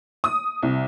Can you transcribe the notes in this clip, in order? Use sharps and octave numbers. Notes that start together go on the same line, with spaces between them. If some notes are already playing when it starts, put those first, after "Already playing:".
D#6
C2